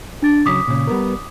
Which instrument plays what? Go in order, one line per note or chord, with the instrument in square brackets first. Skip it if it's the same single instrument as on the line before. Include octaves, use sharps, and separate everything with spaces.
[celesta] D4 A6
[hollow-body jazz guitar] C#3 F#3 [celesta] D6 D#6 B6
[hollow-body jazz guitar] A#2 C#3
G3 B3 A#4